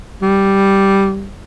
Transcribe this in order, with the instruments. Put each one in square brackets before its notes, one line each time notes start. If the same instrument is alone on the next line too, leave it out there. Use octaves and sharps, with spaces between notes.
[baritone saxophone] G3